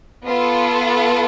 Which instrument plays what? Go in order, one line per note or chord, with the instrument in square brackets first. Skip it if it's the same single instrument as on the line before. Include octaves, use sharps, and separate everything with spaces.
[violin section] B3 F4 A4